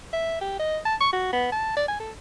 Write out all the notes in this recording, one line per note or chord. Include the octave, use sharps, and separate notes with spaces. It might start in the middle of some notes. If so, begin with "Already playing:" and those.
E5
G4
D#5
A5
C#6
F#4
B3
A5
D5
G#5
A4